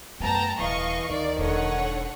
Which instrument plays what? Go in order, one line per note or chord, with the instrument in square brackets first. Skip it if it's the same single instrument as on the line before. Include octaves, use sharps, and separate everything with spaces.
[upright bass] F#2 A3 [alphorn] B3 [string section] G5 A5 A#5
[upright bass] D#1 [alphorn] E3 [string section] D#5 F5 C#6
[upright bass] D2 [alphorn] D#3 [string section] D5
[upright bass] E1 [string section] D3 C#5 F#5